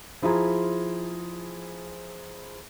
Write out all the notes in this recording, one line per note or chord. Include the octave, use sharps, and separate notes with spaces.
F3 E4 F4 G#4 A#5